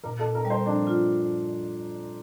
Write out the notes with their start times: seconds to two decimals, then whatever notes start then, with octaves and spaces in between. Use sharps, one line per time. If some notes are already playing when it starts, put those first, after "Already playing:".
0.04 A#2 A#4
0.20 A4
0.24 A#2
0.35 A#4
0.45 G3
0.50 C5
0.66 F3 D4
0.87 F4